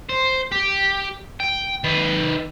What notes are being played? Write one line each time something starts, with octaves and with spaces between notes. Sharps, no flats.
C5
G4
G5
D#3 B4